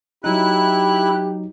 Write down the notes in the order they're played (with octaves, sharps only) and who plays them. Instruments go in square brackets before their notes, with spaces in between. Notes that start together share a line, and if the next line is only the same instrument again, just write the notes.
[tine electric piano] F#3 D#4 [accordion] E4 F#6 [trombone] G4